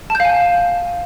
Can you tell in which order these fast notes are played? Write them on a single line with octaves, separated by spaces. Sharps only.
A5 G6 F5 G#5